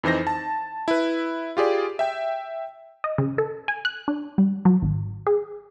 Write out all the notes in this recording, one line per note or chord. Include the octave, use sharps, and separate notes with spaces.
F2 E3 D#4 C5 A#6
A5
E4 B4
F4 G4 G#4 D5
E5 G5
D#5
C#3
A4
G#5
F#6
D4
G3
F#3
G#1
G#4